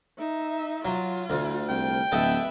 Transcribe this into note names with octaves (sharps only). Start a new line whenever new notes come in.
D#4 E5
F#3 F4
D2
C2 G5
D1 A4 B4 D#5 E5 F#5